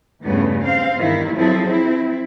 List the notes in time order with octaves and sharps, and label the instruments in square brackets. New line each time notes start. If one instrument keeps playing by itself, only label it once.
[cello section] E2 G2 C#3 A3 B3
C4 F5
E2 G2 D#3 E4
F3 F#3 C4 E4 G#4 A4
C4 E4